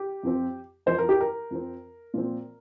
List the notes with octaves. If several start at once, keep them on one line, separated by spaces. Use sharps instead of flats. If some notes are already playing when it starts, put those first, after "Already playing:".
Already playing: G4
F2 F3 C4
F2 F3 C4 C5
A#4
G4
A#4
F2 F3 C4
A#2 F3 C4